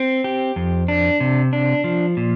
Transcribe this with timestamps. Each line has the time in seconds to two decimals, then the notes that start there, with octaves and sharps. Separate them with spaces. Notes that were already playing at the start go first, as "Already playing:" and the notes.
Already playing: C4
0.24 G4
0.56 F2
0.88 D4
1.20 C3
1.53 D4
1.84 F3
2.17 A#2